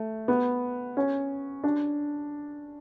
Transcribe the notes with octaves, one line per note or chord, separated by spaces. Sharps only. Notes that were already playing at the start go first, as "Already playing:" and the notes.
Already playing: A3
B3
C#4
D4